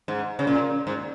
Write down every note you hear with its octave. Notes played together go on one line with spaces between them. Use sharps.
G#2
C#3
A#2
G#2